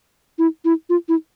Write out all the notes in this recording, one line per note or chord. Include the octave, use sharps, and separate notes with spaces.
E4
E4
F4
E4